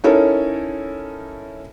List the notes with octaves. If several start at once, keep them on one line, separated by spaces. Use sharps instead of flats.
C#4 D#4 E4 A4 A#4 C#5